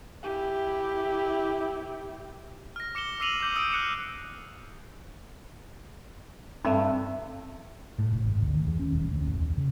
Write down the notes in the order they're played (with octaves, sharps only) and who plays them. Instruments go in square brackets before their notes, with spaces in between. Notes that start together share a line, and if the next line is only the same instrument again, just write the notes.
[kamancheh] E4 G4
[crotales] F6 A#6
D6 C#7 E7 G7
D6 E6 C7 D#7 F7 F#7
D6 G6 C7
D#6 E6 G6 C#7 D7
F6 F#6 C#7 E7
[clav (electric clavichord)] G2 [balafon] G3 C4 A4 [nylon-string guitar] E5
[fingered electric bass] A2
F1
G#1
D2
D#3
E2
C#4
D#1
D2
E2
D#2
C#3